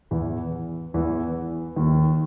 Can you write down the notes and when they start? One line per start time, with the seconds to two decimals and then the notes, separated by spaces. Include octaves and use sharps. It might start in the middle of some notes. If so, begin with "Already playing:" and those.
0.11 E2 E3
0.94 E2 E3
1.76 D#2 D#3